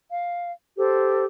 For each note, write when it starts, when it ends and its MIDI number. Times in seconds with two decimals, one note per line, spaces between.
0.12 0.51 77
0.77 1.25 67
0.77 1.25 69
0.77 1.25 72